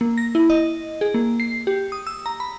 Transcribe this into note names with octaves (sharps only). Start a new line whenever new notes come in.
A#3
A#6
E4
D#5
G#4
A#3
C7
G4
D#6
E6
A#5
B5